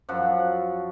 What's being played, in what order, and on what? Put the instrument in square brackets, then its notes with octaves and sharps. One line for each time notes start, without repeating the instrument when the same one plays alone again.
[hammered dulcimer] F#2 F3 F#5